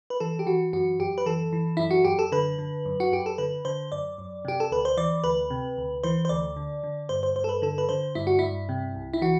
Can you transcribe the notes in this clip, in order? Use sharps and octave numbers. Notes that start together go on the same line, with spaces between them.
B4
E3 A4
G4
E3 F#4
F#2 F#4
F#2 G4
B4
E3 A4
E3
F#2 E4
F#4
F#2 G4
A4
D3 B4
D3
F#2
F#4
F#2 G4
A4
D3 B4
D3 C5
F#2 D5
F#2
C3 G4
A4
D2 B4
C5
E3 D5
D2 B4
C3
D2
E3 C5
C5
D2 D5
D3
D3
G2 C5
C5
G2 C5
A4
B4
D3 A4
B4
D3 C5
G2 E4
F#4
G2 E4
C3
C2
E4
E3 F#4